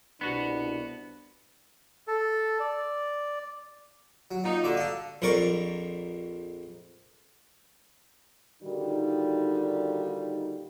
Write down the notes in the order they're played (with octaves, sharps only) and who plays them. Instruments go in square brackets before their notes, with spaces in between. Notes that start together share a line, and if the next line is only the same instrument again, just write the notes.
[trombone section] C2 B2 D4 [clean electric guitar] B3 F#4
[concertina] A4
D5
[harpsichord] F#3
[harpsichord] A#2 [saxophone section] D#4
[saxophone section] D3 [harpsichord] F#4 D5 D6
[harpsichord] A4 F5
A#1 F2 A#4 D5 C#6
[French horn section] A#2 D3 D#3 G3 D#4 F#4